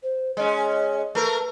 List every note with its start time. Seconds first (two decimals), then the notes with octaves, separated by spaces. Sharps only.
0.03 C5
0.37 G#3 C#4 D#5
1.15 A3 A#4 B4